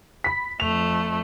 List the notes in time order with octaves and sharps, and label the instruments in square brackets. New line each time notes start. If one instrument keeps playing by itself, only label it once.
[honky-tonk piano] B5 B6
[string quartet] F2 A3 [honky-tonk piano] F7